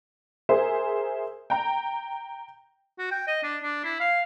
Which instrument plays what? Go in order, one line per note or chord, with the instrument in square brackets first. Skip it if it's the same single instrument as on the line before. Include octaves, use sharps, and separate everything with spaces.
[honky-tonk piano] G#4 A#4 C5 E5
G5 A#5
[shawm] F#4
G5
D#5
D4
D4
E4
F5